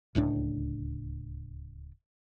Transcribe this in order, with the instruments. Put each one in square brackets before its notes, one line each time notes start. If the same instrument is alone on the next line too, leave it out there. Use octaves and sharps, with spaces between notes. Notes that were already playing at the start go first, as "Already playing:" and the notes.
[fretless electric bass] D1 C#2 A2 D4